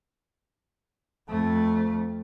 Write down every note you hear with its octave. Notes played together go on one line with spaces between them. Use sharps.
F2 A3